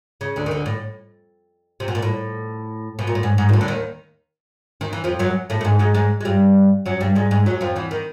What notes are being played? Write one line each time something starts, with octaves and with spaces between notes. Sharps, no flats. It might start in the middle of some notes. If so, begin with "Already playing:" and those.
C#3
D2 D3
D#3
D2 D3
A2
C3
B2
A#2
A2
B2
A#2
A2
G#2
G#2
A#2
A2
D3
D#2 D#3
D#3
E3
F2 F3
F#2 F#3
A2 A3
A3
G#2 G#3
G#2 G#3
G#2 G#3
G#3
G2 G3
F#2 F#3
G2 G3
G#2 G#3
G#2 G#3
F#2 F#3
F2 F3
E2 E3
D#3